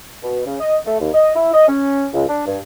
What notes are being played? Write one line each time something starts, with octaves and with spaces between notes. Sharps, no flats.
B2
C#3
D#5
A3
D#2
D#5
E4
D#5
C#4
C#2
D4
G2